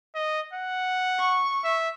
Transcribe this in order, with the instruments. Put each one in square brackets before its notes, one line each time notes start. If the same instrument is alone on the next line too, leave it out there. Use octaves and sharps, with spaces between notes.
[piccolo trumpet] D#5
F#5
[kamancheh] C#6
[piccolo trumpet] E5